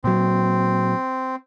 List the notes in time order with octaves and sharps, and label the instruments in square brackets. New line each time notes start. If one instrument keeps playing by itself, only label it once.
[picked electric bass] A#2 F#3 [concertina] C4